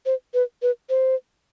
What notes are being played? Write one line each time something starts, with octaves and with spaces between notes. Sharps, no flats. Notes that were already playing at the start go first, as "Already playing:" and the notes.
C5
B4
B4
C5